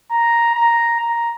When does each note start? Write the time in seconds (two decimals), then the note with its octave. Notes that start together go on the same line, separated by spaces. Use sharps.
0.11 A#5
0.55 A#5
1.00 A#5